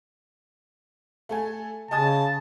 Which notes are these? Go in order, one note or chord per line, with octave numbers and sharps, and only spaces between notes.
A3 A4 G#5
C#3 D#5 G#5 A5 D#6